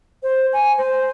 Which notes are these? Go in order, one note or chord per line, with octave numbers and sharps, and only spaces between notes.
C5
G#5
C5